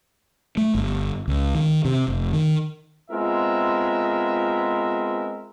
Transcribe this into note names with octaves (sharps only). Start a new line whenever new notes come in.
A3
G1
C#2
D#3
C3
F1
D#3
G#3 B3 C4 F4 A#4 E5